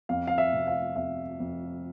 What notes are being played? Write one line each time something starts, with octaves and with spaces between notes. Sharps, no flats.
F2 F5
F5
E5
C3
F5
F2 E5
F2